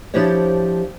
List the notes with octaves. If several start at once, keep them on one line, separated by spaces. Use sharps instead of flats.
F3 D4 E4 G4 C5 C#5